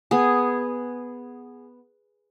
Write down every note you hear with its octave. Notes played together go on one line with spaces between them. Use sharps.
B3 G#4